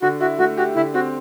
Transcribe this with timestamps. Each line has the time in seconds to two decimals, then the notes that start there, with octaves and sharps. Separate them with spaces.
0.02 D3 F#4
0.20 E4 F#4
0.39 A3 F#4
0.57 F#4 G4
0.76 D3 E4
0.94 C4 F#4